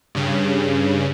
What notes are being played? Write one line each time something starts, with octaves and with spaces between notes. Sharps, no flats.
G2 C#3